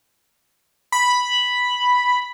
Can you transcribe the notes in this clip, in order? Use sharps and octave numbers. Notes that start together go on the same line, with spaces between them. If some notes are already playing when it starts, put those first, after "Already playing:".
B5